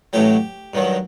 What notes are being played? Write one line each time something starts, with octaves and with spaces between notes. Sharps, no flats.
A1 A2 F#3 G4
G2 D#3 F#3